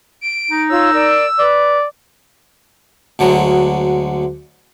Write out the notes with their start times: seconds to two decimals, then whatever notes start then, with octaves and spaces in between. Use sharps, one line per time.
0.21 D7
0.51 D#4
0.70 F4 C#5 E6
0.93 A#4 D5
1.39 B4 D5
3.19 D2 D3 F#3 G#3